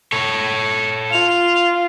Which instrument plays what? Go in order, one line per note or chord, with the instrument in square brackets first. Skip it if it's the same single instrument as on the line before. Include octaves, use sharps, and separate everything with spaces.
[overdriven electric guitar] A4 C#5
[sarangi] F4 [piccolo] F7